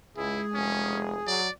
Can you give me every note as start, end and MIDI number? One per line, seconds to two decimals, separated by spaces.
0.17 0.41 37
0.17 1.26 56
0.17 0.43 64
0.17 1.40 68
0.54 1.20 29
0.54 1.00 61
1.27 1.48 54
1.27 1.50 74